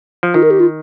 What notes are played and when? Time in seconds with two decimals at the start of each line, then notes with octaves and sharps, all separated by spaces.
0.23 F3
0.34 D#3 F4
0.43 A#4
0.51 G4
0.60 F4